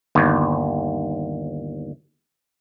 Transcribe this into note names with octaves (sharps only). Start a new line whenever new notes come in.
G1 D#2